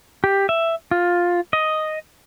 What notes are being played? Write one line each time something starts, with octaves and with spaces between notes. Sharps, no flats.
G4
E5
F4
D#5